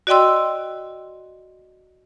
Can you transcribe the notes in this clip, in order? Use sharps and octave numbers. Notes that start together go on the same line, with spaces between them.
F#4 D5 D#5 G5 C6 E6